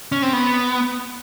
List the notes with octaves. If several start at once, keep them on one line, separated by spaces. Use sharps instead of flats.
C#4
C4
B3